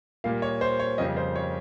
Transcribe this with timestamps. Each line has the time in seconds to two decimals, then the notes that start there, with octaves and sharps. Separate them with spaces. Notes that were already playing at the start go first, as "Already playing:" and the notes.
0.24 A#2 G3 A#3 F5
0.42 C#5
0.61 C5
0.80 C#5
0.98 F2 C#3 G3 A#3 D#5
1.17 C5
1.36 C#5